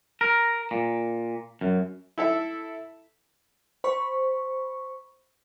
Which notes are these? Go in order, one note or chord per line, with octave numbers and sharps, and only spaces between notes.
A#4
A#2
F#2
E4 A4 E5
C5 B5 C#6